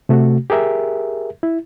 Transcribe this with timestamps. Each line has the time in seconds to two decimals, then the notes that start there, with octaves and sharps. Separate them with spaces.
0.09 C3 A3 F#4
0.50 G4 G#4 A#4 E5
1.43 E4